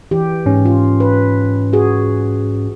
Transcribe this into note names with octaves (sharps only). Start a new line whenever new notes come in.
E3 G4
G#2 C#4
F4
B4
F#4 G#4